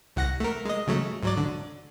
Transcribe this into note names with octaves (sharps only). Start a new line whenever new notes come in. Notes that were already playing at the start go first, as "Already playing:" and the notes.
C2 F#5 A#6
A3 A#4
G#3 D#5
C#3 F#3 A3
G#2 F#3 D5
D3